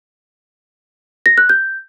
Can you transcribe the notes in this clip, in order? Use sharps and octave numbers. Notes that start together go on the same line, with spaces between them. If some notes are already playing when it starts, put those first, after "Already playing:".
A#6
F#6
G6